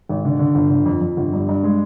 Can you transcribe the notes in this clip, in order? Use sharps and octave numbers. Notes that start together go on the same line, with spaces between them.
G#1
D3
D3
G1
D3
F2
F2
G1
G2
G2
G#3